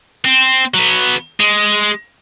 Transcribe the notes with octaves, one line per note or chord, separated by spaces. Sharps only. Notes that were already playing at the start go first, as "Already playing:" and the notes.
C4
F#3 B3
G#3